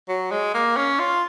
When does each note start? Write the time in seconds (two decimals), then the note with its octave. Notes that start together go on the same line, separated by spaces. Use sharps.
0.08 F#3
0.31 G#3
0.54 A#3
0.77 C#4
0.99 F4